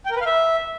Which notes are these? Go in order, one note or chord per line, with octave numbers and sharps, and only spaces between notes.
G5
A#4
B4
F5
E5